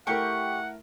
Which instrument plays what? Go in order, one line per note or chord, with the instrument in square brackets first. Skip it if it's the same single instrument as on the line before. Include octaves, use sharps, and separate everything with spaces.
[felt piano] A3 E4 A#4 [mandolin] G4 C#6 [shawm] F#5